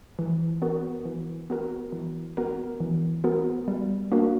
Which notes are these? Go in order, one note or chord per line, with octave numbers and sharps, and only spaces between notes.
E3
B3 F#4 A#4
E3
B3 F#4 A#4
E3
B3 F#4 A#4
E3
B3 F#4 A#4
G3
A#3 D4 F#4 A#4